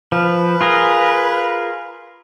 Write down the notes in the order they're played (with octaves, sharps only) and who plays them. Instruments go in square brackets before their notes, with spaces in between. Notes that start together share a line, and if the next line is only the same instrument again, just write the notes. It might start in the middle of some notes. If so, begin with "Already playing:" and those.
[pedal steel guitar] F3 [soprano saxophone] B4
[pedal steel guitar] F4 G#4 A#4